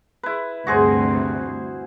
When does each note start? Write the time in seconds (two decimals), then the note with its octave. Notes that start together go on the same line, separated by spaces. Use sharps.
0.23 E4 B4
0.67 D2 G2 C3 F#4 G#4 C5